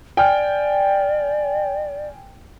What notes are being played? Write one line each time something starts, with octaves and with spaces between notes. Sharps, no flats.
D5 G5 G#5 F6